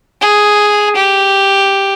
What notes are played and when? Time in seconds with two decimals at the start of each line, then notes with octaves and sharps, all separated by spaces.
0.21 G#4
0.96 G4